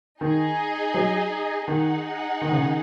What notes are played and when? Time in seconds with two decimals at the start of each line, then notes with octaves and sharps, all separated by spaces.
0.21 D#3 D#4 G#4 D#5
0.94 F#3
1.67 D#3 D#4 G#4 F#5
2.41 D#3
2.52 C#3
2.62 D#3